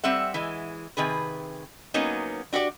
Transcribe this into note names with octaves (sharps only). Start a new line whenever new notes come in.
G3 C4 E5 F#5
E3 G#3
C3 D#3 G#4 B4
F#3 A#3 B3 C#4 D#4
D4 F#4 G4 D5